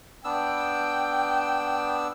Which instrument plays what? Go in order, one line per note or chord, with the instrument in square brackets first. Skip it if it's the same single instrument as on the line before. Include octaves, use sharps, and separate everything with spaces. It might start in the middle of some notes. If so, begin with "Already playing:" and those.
[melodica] B3 D4 E6 [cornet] G5